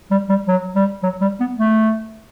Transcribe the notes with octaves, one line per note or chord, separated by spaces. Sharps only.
G3
G3
F#3
G3
F#3
G3
B3
A3